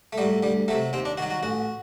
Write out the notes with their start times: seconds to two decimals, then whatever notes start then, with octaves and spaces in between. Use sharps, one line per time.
0.13 A3
0.18 A2 F#3 G3
0.43 D2 G3
0.68 C3 F#3 A3
0.93 D#2 C4
1.05 D4
1.17 D#3 F#3 F#4
1.30 F#4
1.43 A1 F#4